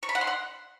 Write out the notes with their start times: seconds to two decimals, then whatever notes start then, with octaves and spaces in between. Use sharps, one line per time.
0.03 C#6
0.09 B5
0.15 F#5
0.21 C6
0.27 F#5